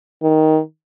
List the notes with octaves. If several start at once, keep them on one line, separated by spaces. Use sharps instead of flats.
D#3